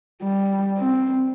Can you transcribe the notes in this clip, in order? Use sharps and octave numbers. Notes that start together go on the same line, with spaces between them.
G3
C4